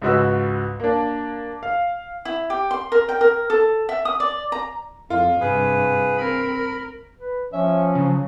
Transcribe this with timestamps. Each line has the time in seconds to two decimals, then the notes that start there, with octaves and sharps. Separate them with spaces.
0.02 C#2 G#2 F#4 B4 E6
0.80 A#3 D4
1.63 F5
2.25 E4
2.50 G4
2.71 C6
2.92 A#4
3.09 G5
3.21 A#4
3.50 A4
3.89 E5
4.05 D#6
4.20 D5
4.52 A#5
5.10 F2 F4
5.41 G2 C3 G#4 B4
6.17 C4 A#4 B5
6.54 A#4
7.18 B4
7.53 F3 C#4 E5
7.95 C#3 F#3